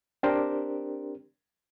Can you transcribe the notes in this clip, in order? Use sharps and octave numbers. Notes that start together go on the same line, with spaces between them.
C4 D4 G4 A#4 C5